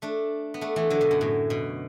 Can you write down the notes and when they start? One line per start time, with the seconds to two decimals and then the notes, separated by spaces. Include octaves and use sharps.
0.02 A3 D4
0.54 B3
0.61 A3 D4
0.76 E3 A3
0.90 D3 F#3
1.01 B2
1.11 F#2
1.21 A2
1.50 B2